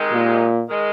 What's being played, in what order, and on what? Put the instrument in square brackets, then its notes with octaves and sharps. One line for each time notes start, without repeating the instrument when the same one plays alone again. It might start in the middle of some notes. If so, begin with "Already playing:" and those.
Already playing: [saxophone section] C3 D#3 G#3 D#4 G4
[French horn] A#2
[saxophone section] D#3 G#3